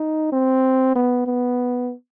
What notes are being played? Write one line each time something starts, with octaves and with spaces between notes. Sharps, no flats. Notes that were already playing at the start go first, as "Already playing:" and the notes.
Already playing: D#4
C4
B3
B3